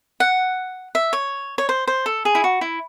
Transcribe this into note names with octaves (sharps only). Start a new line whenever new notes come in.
F#5
E5
C#5
C#5
C5
C5
A4
G#4
E4
F#4
E4